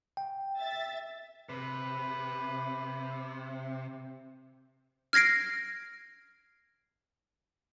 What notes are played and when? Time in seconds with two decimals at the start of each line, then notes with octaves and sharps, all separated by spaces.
0.17 G5
0.58 E5 A6
1.49 C3 B4
5.13 F6 G#6 A#6 C7 D7